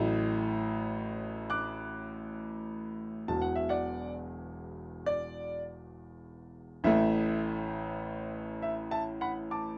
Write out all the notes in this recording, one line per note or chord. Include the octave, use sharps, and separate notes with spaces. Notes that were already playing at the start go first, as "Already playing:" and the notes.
Already playing: A1 A2 F#3 A3
D6 F#6
E1 E2 B2 F#3 A5
F#5
E5
D5 F#5
D5
A1 A2 A3 E5
E5
E5 A5
F#5 B5
A5 D6